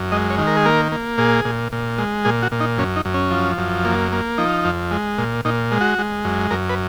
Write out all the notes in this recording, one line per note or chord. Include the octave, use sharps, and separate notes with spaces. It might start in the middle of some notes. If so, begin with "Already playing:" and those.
Already playing: F#2
G#3 D#5
C#5
D#3
A#4
G#4
A#3 A#4
A#3
A#2 G#4
A#2
A#2
G#3
A#2 G#4
F#4
A#2
D#4
F#2 C#4
D#4
F#2
C#4
F3
F#2
A#3
A#3
F3 D#4
F2
G#3
A#2
A#2 D#4
G#3
F#4
G#3
F#2
F#2 A#4
B4